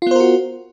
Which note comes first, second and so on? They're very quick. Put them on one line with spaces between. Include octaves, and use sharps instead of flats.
F4 B3 C5 A#4 F#4